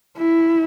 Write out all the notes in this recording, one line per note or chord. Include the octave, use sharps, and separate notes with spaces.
E4